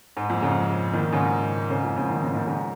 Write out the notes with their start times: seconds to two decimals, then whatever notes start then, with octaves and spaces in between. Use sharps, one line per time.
0.17 G#2
0.30 F2 A#2
0.42 G#2 C#3
0.93 A#2 D#3
1.12 G#2 C#3
1.70 G#2 C#3
1.83 F2 A#2
1.96 G#2 C#3
2.09 A#2 D#3
2.22 G#2 C#3
2.34 A#2 D#3
2.47 G#2 C#3